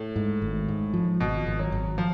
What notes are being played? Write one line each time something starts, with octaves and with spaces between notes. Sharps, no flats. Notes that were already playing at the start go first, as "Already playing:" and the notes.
Already playing: A2
G#2
G#1
G#2
F3
G#1 B2
G#1
F#3
G#1
F3